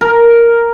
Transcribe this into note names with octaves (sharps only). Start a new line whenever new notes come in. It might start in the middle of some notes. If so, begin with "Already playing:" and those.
A#4